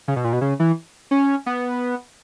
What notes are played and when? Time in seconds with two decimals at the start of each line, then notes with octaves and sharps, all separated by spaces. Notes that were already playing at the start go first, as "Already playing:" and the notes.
0.08 C#3
0.16 B2
0.24 A#2
0.33 B2
0.41 C#3
0.60 E3
1.11 C#4
1.46 B3